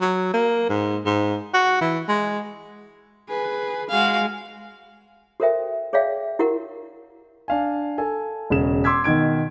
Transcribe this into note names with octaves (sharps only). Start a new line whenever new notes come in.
F#3
A#3
G#2
G#2
F#4
E3
G#3
G#4 B4
G#3 F#4 G#4 F5
F#4 A4 A#4 C5 E5 G5
G#4 C#5 D5 E5 F5 G5
E4 F#4 G4 A#4 F#5
D4 F5 G#5
A4 G#5
E1 C#3 E7
C6 D6 E6 G#6 B6
B2 D#3 G#6 D7